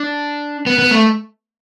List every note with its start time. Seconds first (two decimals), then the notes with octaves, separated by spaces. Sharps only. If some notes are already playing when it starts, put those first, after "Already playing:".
Already playing: D4
0.66 B3
0.79 B3
0.91 A3